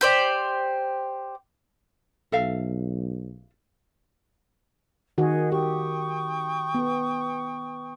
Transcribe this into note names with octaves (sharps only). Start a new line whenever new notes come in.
G4 C5 D5
B1 A4 E5 F5
D#3 F#4 G#4 D#5
G4 G5 C#6 D#6
B3